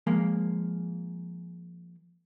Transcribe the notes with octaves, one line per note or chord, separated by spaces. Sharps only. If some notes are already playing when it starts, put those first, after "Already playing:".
F3 G#3 A#3